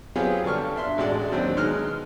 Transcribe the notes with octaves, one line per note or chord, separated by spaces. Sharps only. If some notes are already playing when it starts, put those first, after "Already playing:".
F#3 B3 C4 F4 G4 G#4
G2 D3 D4 C#6 F6
D4 E5 C6
A1 G#3 F#4 D5 A5
D#2 F#3 C4 D4
B2 G#3 D#4 F6 F#6